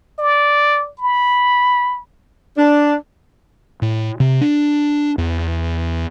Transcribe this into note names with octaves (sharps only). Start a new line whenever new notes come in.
D5
B5
D4
A2
C3
D4
E2